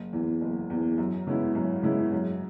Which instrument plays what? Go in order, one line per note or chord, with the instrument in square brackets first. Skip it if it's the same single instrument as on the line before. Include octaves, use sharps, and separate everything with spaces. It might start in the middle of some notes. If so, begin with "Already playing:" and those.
Already playing: [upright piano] F#1
E2 E3
F#1
E2 E3
F#2
C#3 G#3 B3 E4
F#2
C#3 G#3 B3 E4
F#2